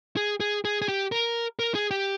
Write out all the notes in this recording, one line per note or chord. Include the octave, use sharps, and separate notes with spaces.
G#4
G#4
G#4
G#4
G4
A#4
A#4
G#4
G4